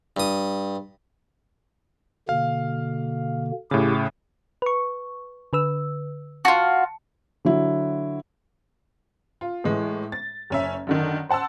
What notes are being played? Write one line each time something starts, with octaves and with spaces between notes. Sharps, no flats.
G2 D#6
B2 D3 A#3 F5
A2 C#3 E4 G4 D6
B4 C#6
D3 B4 E6
F4 F#4 A5
D3 F#3 E4
F4
A2 E3 G#3
A6
F#1 C#4 E5
F#2 D3 D#3
C5 F#5 A5 C6 E6